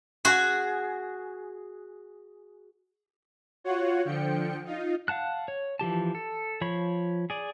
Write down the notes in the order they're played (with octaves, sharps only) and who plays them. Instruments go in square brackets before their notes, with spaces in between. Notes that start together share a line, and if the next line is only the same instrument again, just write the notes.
[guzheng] F#4 G#4
[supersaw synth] F4 F#4 C#5 F#5
D3 F3 G5 C#7
D#4 F4
[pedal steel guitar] F5 F#5 A5 F#6
C#5
E3 F3 G4 A5
A4
F3 C#5 B5 C#6
G#4 D5